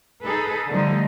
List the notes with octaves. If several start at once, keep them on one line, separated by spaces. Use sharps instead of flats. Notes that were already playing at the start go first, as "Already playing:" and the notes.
D#4 G#4 A4 B4
D3 F3 G3 A3 D#4